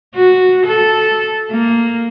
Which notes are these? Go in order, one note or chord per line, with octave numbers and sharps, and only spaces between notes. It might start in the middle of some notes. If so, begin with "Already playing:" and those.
F#4
A4
A#3